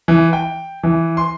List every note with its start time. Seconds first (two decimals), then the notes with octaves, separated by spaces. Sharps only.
0.08 E3
0.33 G5
0.83 E3
1.17 C6